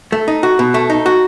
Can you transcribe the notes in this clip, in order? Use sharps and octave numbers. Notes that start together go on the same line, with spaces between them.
A3
D#4
F#4
B2
A3
D#4
F#4